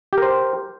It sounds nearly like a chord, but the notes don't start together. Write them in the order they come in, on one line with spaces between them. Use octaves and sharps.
G4 A#4 C5